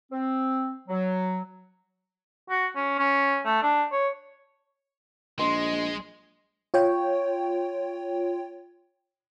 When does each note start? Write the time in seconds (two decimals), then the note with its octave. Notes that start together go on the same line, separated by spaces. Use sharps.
0.12 C4
0.88 F#3
2.50 F#4
2.75 C#4
2.99 C#4
3.45 A3
3.63 D4
3.92 C#5
5.39 A#1 G#3 C5 D#5
6.74 F4 C#5 G5